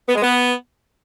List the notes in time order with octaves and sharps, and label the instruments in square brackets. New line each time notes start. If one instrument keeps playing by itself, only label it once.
[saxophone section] B3
G#3
B3